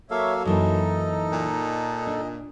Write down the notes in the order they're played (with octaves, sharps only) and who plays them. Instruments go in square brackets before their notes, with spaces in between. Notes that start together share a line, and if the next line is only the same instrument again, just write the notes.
[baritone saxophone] F#3 [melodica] A#3 A4 F5 [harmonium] C#5 E5
[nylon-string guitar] F#2 E3 A#3 [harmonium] D#4 A4 [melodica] D#5
[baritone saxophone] A#2
[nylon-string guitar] D4